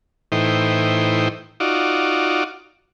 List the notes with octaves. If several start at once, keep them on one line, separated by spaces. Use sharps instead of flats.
A2 E3 D#4 C5 G5
D#4 F4 F#4 D5